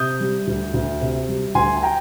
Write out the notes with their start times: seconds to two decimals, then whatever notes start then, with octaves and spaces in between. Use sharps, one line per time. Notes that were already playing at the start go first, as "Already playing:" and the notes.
Already playing: C3 D#6 G6
0.21 G3
0.47 D2
0.74 D2
1.01 C3
1.29 G3
1.55 D2 G#5 C6
1.77 G#5
1.83 G5 A#5